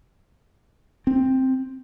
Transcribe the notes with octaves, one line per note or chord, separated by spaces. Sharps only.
C4